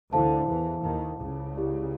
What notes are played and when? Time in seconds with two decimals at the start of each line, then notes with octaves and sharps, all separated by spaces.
0.13 D2 D3 E4 A4 C5 F5 A5
0.48 E2 E3
0.84 D#2 D#3 E4 A4 C5 F5 A5
1.19 C#2 C#3
1.55 E4 G4 A#4 D5 F5